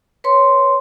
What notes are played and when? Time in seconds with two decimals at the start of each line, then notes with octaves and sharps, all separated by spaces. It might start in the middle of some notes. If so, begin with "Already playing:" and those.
0.24 B4 C#5 C6